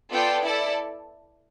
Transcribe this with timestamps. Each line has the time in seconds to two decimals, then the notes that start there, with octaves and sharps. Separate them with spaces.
0.10 B3 F4 A4 D5 G5
0.43 E4 A4 D5 A5